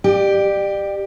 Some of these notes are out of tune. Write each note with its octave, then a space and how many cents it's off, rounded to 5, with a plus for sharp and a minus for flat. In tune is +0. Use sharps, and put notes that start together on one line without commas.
G4 +0 D5 +35